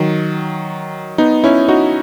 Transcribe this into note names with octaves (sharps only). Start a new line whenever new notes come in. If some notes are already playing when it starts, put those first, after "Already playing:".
Already playing: D#3 F#3
B3 D#4
C#4 E4
D#4 F#4